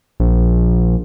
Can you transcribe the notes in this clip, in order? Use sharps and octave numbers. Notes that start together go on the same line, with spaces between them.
A#1